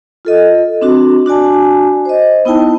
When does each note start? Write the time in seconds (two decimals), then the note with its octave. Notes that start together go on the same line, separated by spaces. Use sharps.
0.25 F4 A4 D#5
0.82 C4 D4 F#4
1.26 D4 F#4 D5 G#5 A5
2.05 C5 D#5
2.45 B3 D#4 E4 G5 A5